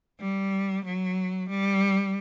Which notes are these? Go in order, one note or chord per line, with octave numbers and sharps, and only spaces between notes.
G3
F#3
G3